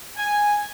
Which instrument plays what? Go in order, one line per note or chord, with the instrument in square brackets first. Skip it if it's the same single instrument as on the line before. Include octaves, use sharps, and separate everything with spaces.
[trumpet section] G#5